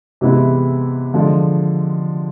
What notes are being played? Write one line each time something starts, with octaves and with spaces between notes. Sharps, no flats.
C3 E3 G#3 B3 E4
D3 F3 G#3